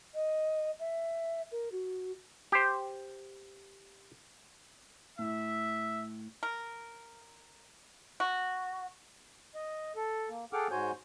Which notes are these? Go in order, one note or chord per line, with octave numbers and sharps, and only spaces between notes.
D#5
E5
A#4
F#4
G4 C5
A2 E5
A#4
F#4
D#5
A4
A#3
G#4 A4 F#5 G5 D6 F6
G#2 F#4 C5 C#5 G#5 G6